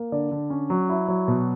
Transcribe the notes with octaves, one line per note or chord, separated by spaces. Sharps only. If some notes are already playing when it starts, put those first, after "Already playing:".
Already playing: A#3
D3 D5
D3
C#4
F#3
E4
F#3
B2